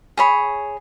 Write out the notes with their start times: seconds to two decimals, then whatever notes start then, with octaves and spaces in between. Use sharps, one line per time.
0.17 G#4 C#5 B5